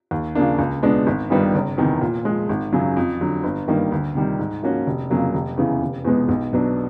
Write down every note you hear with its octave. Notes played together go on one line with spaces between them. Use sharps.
D#2
C#3 F3 A#3 D4
C#2
B2 G#3 B3 D4
G#1
G2 D#3 G3 B3
F#1
E2 C3 D#3
A#2
F3 G#3
G#1
F#2 C#3 F#3
F2
D3 F#3
G1
G2 D#3 G3 A#3
D2
C3 D#3 G3
G#2
F3 A#3 C#4 F#4
F1
F2 C#3 F#3 A#3
F1
E2 C#3 E3
F1
E2 B2 G#3 B3
B1
B2 F#3 B3 D4